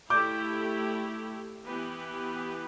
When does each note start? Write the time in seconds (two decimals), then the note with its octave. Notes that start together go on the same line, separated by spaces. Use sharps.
0.10 A3 E4 G4 D6 G6
1.65 E3 B3 G4 B4